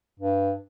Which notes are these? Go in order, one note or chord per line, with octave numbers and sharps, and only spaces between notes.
G2